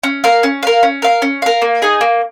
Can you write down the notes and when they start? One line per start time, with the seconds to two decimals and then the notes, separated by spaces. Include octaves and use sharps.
0.03 C#4
0.24 A#4 F5
0.43 C#4
0.63 A#4 F5
0.83 C#4
1.02 A#4 F5
1.22 C#4
1.42 A#4 F5
1.62 A#3
1.82 D#4 G#4 D#5
2.01 A#3